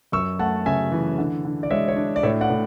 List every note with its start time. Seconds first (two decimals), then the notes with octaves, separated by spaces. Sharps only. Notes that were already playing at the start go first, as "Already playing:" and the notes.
0.12 F#2 C#6 E6
0.39 A3 F#5 A5
0.66 C#3 E5 G#5
0.92 E3
1.18 D3
1.45 D3
1.63 D5
1.70 G#3 C#5 E5
1.88 C#5
1.96 D4
2.16 D5
2.23 A2 C#5 E5
2.41 D5 F#5
2.50 A2